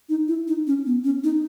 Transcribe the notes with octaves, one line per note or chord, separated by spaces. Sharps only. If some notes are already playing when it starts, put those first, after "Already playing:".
D#4
E4
D#4
C#4
B3
C#4
D#4